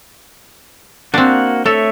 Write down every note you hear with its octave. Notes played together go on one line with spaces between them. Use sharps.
A#3 C4 D4 F#4
A3 A4 C#5 E5